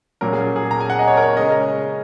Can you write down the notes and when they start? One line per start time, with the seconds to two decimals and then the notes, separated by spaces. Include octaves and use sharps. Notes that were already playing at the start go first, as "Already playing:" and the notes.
0.21 A#2 F#3 C#4 A#4
0.33 G#4
0.56 G#4
0.71 A#5
0.81 G#5
0.90 F#5
0.99 D#5
1.07 C#5
1.17 A#4
1.22 C#5
1.37 C#3 G#3 C#4 D#5